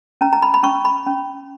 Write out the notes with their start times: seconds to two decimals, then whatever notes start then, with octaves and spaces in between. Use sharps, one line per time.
0.21 C#4 A#5
0.33 A#5
0.42 B5
0.54 B5
0.63 C#4 C#6
0.85 B5
1.06 C#4